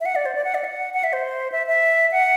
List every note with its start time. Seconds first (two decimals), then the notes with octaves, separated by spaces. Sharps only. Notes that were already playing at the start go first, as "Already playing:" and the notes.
0.01 E5
0.05 F#5
0.15 D5
0.25 C5
0.35 D5
0.44 F#5
0.54 D5
0.64 F#5
0.94 F#5
1.04 E5
1.13 C5
1.52 E5
1.67 E5
2.12 F#5